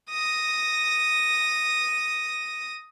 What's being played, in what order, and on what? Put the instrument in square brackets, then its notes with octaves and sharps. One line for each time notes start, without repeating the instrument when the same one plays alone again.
[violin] D#6 A#6